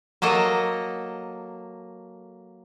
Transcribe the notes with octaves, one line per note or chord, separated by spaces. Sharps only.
F#3 A#3 A4 D#5